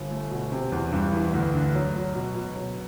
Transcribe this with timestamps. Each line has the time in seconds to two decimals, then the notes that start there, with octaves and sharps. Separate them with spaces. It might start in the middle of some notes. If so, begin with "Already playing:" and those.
Already playing: G1
0.11 A3
0.31 B2
0.52 C3
0.72 E2
0.92 G2
1.13 E3
1.33 D2
1.54 D3
1.75 F#3
1.95 F#3
2.15 B2
2.35 B2
2.56 F#3